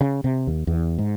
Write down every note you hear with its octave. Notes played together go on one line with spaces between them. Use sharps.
C#3
C3
D#2
E2
G#2